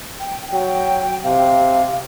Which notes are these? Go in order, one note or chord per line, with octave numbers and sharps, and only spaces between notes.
G5
F#3 G5
C3 F5